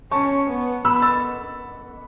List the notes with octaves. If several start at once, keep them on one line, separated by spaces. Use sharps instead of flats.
C#4 A5 C#6
B3
B3 B5 E6
E6 A6